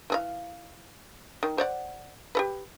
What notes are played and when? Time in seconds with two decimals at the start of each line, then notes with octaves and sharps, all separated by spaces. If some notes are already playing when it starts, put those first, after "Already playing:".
0.10 E3 G#4 F5
1.43 D#3
1.58 C5 D5 F#5
2.35 G4 A4 B4